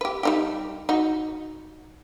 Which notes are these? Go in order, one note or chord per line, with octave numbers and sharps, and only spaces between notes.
G4 B4
G3 D#4 G4
D#4 F#4